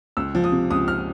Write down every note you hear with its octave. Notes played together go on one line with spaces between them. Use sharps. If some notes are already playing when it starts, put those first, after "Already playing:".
C#2 E6
F3
D#6
C3
C#2 D#6
F6